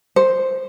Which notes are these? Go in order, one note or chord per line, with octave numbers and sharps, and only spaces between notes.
C5